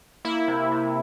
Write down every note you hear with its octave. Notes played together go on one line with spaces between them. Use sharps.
A#3 E4
C3
C3